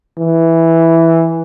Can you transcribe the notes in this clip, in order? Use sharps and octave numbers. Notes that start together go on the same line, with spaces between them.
E3